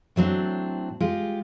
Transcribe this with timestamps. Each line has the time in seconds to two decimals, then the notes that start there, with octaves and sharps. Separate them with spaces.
0.16 A2 F#3 C4 D4
1.00 G#3 F4 G4